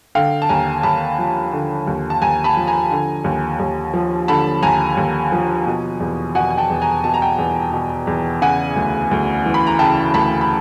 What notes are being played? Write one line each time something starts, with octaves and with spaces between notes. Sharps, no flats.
D3 F5 G5
A5
D#2 G#5 A#5
D#2 A5 B5
F3
D3
D#2
A5
D#2 G#5 A#5
A5 B5
F3
G#5 A#5
D3
D#2
D#2
F3
D3 A5 B5
D#2 G#5 A#5
D#2
F3
B2
E2
B2 F#5 G#5
G#5
G5 A5
E2
G#5 A#5
B2 A5
A#5
G5 A5
E2
B2
E2
C#3 F#5 G#5
D2
D2
E3
B5
A#5
C#3 G5 A5
D2 A5 B5
B5